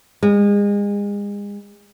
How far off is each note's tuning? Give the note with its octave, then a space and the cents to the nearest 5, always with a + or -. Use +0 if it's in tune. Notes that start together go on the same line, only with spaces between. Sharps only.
G#3 -35